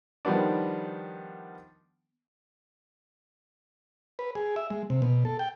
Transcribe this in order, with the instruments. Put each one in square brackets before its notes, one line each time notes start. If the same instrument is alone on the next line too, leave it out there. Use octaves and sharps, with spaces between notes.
[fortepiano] D#3 F3 G3 B3 D4
[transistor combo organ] B4
G#4
E5
G#3
C3
B2
A4
G5